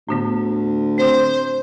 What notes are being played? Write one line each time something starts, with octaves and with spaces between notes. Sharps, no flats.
D2 A2 D3 B3
D3 C4 C5